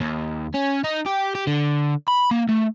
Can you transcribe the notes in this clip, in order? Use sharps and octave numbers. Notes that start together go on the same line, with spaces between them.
D#2
C#4
D#4
G4
G4
D3
B5
A#3
A3